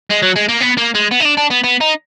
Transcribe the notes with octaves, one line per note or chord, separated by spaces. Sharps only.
G#3
F#3
G#3
A#3
B3
A#3
G#3
B3
D#4
D4
D4
B3
B3
D#4